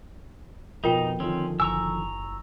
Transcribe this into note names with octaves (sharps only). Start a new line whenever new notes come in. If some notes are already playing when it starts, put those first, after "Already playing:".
F2 B2 D#4 F4 A#4 G5
D3 D#3 F3 C4 C#4
F#1 G#5 A#5 C#6 E6